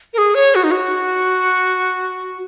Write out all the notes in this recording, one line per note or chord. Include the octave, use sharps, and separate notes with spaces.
A#4
G#4
C#5
F#4
D#4
F#4